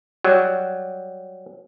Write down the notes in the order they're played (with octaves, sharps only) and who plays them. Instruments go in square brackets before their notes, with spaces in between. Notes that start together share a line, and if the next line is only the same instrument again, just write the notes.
[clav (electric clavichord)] F#3 G3